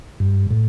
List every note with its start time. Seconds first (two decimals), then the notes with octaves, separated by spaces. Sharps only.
0.20 G2
0.50 A2